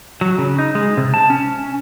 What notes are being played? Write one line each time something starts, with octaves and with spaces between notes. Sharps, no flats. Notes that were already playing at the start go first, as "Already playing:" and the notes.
F#3
C#3
D#4
G#3
C3
A5
C#4